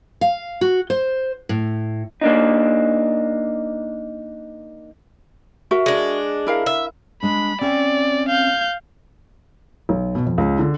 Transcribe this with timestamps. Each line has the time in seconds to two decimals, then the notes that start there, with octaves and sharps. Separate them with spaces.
0.21 F5
0.61 F#4
0.90 C5
1.49 A2
2.21 A#3 D4 D#4
5.71 F#4 A#4 E5
5.86 G#3 D4
6.47 E4 A#4 F5
6.66 E5
7.23 G#3 D4 B5
7.61 C4 C#4 D5 E5
8.29 F5 G6
9.89 B1
10.15 B2
10.26 F2
10.38 C#2
10.59 D3